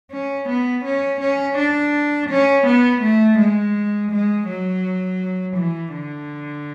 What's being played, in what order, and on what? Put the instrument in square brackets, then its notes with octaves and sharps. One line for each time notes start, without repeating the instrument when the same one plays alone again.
[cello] C#4
B3
C#4
C#4
D4
C#4
B3
A3
G#3
G#3
F#3
E3
D3